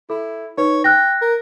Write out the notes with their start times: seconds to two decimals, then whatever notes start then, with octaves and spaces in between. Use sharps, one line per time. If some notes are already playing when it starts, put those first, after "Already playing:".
0.10 E4 A4
0.58 D#4 B4 C#5
0.84 G5 F6 F#6 A#6
1.21 A#4